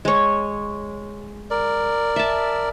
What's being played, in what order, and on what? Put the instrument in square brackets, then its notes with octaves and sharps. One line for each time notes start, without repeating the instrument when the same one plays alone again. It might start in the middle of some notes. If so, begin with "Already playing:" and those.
[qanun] G#3 C#5
[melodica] A#4 D5
[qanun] E5 A5